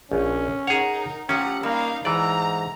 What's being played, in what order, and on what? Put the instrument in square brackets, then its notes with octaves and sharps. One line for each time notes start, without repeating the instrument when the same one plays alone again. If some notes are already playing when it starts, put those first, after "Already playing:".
[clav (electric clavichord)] A#1 [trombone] C#4
[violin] D#4 A#4 [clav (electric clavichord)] G#4 C#5 [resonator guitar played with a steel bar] F#5
[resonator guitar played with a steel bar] F3 A3 [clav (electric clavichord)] C#4 [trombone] G4 [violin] F#5 A#5
[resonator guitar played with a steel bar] G3 [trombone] A#3 [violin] D#4 F5
[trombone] G#2 [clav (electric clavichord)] E3 D5 [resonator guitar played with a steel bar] A3 [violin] A#5